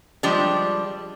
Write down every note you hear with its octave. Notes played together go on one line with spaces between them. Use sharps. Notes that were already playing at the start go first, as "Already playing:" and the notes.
F3 G3 G#3 D4